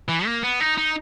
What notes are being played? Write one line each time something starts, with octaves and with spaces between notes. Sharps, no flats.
E3
A#3
B3
D#4
D#4